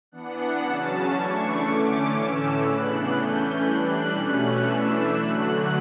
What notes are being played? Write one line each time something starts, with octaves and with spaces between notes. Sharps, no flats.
E3 B3 D4 F#5
C#3 F#3 C#4 A5
E3 A3 D4 C#6
D3 A3 C#4 D6
A2 E3 A3 C#4 E6
C#3 E3 B3 D4 F#6
E3 A3 C#4 G6
E3 G3 D4 F#6
B2 A3 C#4
E3 A3 D4 E6
D3 F#3 A3 F#6